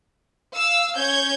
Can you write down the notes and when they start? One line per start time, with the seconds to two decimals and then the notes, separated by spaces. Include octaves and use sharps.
0.54 F5 E6
0.95 C#4 C#5 G6 G#6